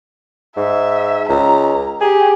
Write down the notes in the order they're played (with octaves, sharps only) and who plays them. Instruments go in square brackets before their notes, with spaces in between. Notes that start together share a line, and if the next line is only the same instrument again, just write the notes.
[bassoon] G#2 [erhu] E5
[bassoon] C#2 [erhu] A#5
[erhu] G4 [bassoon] G#4